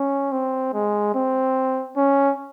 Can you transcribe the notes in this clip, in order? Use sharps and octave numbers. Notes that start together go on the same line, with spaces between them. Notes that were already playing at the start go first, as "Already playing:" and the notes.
Already playing: C#4
C4
G#3
C4
C#4